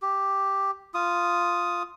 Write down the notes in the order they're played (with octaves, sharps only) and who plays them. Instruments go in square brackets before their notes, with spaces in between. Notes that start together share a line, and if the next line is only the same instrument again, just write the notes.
[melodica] G4
F4 D#6